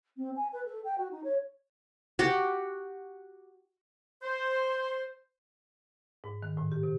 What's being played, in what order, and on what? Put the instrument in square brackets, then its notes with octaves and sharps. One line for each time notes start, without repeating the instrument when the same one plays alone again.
[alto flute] C4
G#5
B4
A4
G5
F#4
D#4
C#5
[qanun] F#4 G4
[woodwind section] C5
[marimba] G#2
D#3
A2
G4
C3